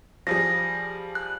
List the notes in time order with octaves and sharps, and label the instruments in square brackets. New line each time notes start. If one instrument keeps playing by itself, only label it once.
[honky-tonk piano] F3 G3 G#4 [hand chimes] A#6
[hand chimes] F#6